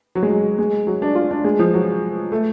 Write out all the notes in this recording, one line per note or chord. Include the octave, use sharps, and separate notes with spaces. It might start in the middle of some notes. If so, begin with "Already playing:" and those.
F#3
G#3
F#3
G#3
F#3
D4
F4
D4
G#3
F3
F#3
A3